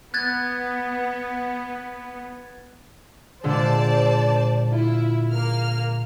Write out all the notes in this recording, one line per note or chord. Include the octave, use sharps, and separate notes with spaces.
B3 F#6 G#6 A6
A#2 D3 G#3 C5 D5 A5
E4 F4
A#3 F6